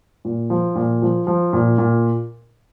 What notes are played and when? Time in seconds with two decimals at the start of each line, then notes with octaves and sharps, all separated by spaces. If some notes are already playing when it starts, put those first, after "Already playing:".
0.25 A#2
0.50 F3
0.76 A#2
1.02 F3
1.27 F3
1.53 A#2
1.78 A#2